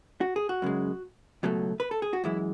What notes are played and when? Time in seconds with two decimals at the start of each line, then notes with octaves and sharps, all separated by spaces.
0.21 F#4
0.36 G#4
0.49 F#4
0.62 F#2 C#3 G#3
1.43 C#2 B2 F#3 A3
1.80 B4
1.91 A4
2.02 G#4
2.13 F#4
2.24 F#2 E3 G#3 E4